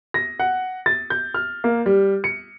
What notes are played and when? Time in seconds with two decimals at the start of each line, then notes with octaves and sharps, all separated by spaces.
0.14 A#6
0.40 F#5
0.86 A6
1.10 G6
1.34 F6
1.64 A#3
1.86 G3
2.24 C#7